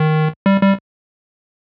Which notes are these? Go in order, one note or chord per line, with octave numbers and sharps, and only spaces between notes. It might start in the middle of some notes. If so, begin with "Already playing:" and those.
Already playing: D#3
G3
G3